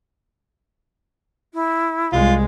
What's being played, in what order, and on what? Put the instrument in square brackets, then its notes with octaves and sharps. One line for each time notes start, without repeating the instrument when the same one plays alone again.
[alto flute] E4
[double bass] C2 G#3 [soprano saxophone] F4